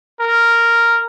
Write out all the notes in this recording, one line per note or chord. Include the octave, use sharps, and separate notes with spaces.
A#4